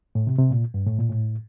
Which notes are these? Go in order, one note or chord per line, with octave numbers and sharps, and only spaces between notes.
A2
C3
C3
A#2
G2
A2
A#2
A2